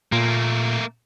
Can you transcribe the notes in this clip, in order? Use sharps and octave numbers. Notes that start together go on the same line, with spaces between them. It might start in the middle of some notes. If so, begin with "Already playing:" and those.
A#2 A3 A#3